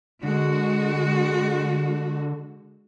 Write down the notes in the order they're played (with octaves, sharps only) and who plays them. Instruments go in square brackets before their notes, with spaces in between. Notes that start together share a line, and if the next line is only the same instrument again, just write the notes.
[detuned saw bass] D3 [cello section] G#3 F#4